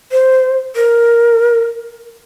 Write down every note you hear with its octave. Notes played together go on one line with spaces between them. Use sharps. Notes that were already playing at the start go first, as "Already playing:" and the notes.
C5
A#4